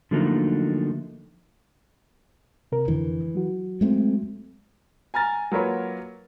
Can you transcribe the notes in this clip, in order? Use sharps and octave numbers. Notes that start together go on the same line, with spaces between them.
D3 F3 F#3 A3 A#3 D#4
C3 A#4
F2 D3 E3
F#3 F#4
G#3 A3 C4
G#5 A#5 F6 A6
F#3 A#3 F4 A#4 B4 C#5